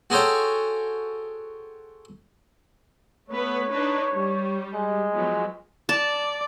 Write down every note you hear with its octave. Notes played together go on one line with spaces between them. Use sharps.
F#4 G#4 A4 C5 C#5 G5
A3 B3 B4 C#5
D4 D#4 B4
G3
G#3
F3 F#3 B3
D5 A5